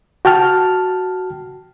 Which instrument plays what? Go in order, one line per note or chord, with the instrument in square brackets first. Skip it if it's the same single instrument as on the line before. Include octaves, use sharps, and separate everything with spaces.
[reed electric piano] F#4 G5 A5 F6